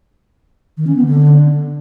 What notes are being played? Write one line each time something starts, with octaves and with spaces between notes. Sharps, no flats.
D#3
C#4
B3
D3